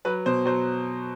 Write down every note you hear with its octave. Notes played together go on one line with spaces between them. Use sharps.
F#3 B4
B2 C5
F#3 C5